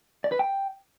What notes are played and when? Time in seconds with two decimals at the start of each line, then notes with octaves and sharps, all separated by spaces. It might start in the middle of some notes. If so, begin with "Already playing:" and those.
0.24 D5
0.32 B4
0.39 G5